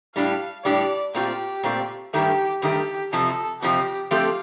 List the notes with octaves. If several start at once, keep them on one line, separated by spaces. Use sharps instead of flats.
A2 G3 D4 G4 F5
A2 G3 D4 G4 D5
A#2 A3 C4 F4 G4
A#2 A3 C4 F4
G2 D#3 A3 G4
G2 D#3 A3 G4
F2 C3 F3 A4
F2 C3 F3 G4
F3 A3 C4 F4 G4